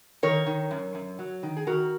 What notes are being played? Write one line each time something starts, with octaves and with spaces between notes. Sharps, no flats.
D#3 A#4 C#5
D#3
F#2
F#2
F#3
D#3
G#4
D#3 F#4 A#4